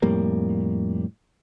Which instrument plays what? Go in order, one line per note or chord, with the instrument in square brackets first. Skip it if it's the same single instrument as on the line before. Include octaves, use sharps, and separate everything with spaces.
[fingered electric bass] F2 A2 G3 A#3